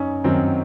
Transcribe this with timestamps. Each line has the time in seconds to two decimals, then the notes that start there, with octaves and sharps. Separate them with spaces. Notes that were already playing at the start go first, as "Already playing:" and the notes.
Already playing: F#2 C#4 D#4
0.24 F#2 D#3 F#3 C4